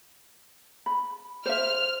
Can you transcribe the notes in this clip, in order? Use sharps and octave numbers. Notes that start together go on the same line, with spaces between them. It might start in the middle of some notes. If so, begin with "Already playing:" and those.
B5
C5 E5 F6